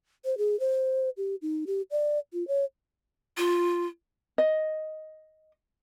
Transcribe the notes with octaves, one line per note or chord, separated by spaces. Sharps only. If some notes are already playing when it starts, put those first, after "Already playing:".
C5
G#4
C5
G4
D#4
G4
D5
F4
C#5
F4
D#5